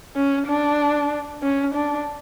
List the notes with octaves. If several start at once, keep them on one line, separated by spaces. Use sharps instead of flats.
C#4
D4
C#4
D4